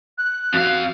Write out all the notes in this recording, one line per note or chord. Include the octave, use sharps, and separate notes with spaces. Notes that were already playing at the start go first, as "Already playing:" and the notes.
F#6
F2 F#4 F5